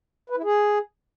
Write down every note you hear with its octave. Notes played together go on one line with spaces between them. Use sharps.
B4
E4
G#4